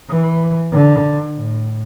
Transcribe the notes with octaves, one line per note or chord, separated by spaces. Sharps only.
E3
D3
A2